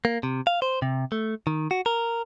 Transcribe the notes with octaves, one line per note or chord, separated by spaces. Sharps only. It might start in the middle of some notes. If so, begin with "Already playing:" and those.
A#3
C3
F5
C5
C3
A3
D#3
F#4
A#4